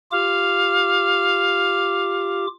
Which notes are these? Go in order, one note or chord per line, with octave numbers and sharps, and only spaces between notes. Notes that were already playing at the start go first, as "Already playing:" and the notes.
F4 G4 F5 D6